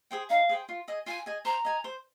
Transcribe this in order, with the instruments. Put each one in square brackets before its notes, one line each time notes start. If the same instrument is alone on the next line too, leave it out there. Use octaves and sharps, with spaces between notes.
[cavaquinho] G#4 C5 G5
[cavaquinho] D#4 [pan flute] F5
[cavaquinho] G#4 C5 G5
F4
G#4 D#5 G#5
[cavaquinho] F4 [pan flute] G#5
[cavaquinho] G#4 D#5 G#5
[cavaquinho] C5 [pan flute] A#5
[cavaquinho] D#5 G#5
C5